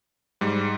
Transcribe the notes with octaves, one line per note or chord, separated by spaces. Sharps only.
G#2 G3